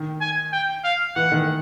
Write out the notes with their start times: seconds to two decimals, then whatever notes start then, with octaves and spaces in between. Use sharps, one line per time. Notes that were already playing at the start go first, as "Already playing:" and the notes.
Already playing: D#3
0.21 G#5
0.53 G5
0.84 F5
1.15 E3 F#5
1.32 D#3